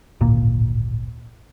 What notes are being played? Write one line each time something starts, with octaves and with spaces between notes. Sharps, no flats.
D1 G#1 A#2 A#3